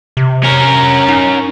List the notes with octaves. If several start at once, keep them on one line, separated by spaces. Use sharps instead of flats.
C3
C#4 A#4
D#4